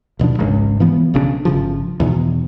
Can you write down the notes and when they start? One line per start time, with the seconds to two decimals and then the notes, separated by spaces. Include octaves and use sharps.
0.19 D#1 B2 F3 D4
0.38 G#1 C#2 G#2
0.80 E3 F3 B3
1.14 B1 C#3 C4 D4
1.45 G1 C#3 F3
2.00 E2 B2 D#3